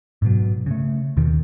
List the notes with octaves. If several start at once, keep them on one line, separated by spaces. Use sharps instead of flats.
G#2 B2 F#3
C#3 A3
D#2 B2 D#3